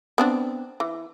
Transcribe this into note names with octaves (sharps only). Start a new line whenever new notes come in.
B3 C4 D4
E3